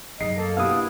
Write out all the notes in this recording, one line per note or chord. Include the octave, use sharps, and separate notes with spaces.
F#2 D#4 G#4 D#5 C7
A#3 A4
B2 A#3 B3 D4 E4 G4 F5 D#6